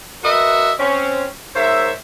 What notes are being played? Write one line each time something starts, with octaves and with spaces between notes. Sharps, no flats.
F#4 A#4 B4 D#5 E5
C4 C#4
G#2 A#4 C5 C#5 E5